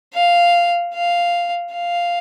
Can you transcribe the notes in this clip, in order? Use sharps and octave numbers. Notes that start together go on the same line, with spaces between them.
F5
F5
F5